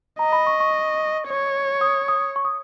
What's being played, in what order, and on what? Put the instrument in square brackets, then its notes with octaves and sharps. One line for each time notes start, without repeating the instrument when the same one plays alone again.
[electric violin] D#5 [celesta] A#5
[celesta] B5
C#6
C#6
[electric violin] C#5
[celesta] D#6
D#6
C#6
D#6